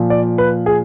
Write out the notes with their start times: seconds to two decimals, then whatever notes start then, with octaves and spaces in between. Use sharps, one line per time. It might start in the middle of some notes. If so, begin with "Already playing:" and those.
Already playing: A#2 F3
0.10 D5
0.38 B4
0.66 G#4